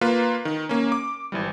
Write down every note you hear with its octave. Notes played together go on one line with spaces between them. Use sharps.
A#3 F4 B4
D#3
A#3 C#4
D6
G#1 E3 G3